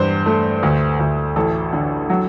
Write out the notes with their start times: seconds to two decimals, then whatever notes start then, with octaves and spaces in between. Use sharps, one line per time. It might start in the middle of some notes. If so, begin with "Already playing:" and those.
Already playing: E2 G2 C5
0.26 A3
0.63 D2
0.99 D2
1.36 A1 A4
1.73 D3
2.10 F#3